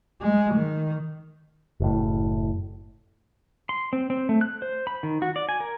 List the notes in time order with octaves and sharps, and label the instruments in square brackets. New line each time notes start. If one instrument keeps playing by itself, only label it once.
[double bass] G#3
D#3
[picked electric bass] F#1 A2
[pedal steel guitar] C6
C4
C4
A3
F#6
C5
B5
D#3
F#4
D5
G#5
A#4